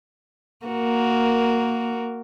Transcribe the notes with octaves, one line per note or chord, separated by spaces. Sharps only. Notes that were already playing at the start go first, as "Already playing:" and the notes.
A#3 F#4 A#4